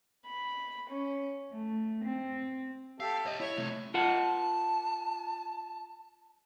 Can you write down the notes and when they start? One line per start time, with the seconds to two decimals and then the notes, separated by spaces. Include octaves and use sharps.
0.25 B5
0.88 C#4
1.52 A3
2.04 C4
3.00 G4 A4 E5 F5
3.26 C#5 D#5
3.40 E4 C#5
3.57 C3 A3
3.94 F4 A#4 F#5 A5